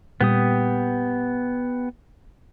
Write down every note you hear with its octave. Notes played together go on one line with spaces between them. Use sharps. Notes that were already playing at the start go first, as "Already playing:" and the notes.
A#2 G3 B3 G4 D#6